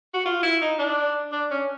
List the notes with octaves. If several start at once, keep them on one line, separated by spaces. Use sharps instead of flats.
F#4
F4
E4
D#4
D4
D4
C#4